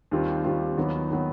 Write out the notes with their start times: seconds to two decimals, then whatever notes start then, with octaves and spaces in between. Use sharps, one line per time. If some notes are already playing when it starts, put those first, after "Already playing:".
0.11 D#2 D#3 G3 C4 F4
0.44 D#2 D#3 G3 C4 F4
0.77 D#2 D#3 F#3 B3
1.11 D#3 F#3 B3